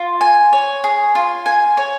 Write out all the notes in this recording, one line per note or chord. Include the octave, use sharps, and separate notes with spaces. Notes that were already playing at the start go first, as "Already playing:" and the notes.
Already playing: F4
G#5
C#5
G#4
F4
G#5
C#5